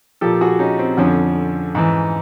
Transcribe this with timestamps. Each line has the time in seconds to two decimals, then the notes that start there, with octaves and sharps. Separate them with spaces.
0.21 A#2 F3 G4 A4
0.41 F#4 G#4
0.59 C#4 D#4
0.79 C4
0.97 F2 D3 F3 C#4
1.75 G#2 E3